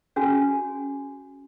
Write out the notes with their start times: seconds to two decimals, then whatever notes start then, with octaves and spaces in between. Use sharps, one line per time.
0.16 C#4 F#4 G#4 G#5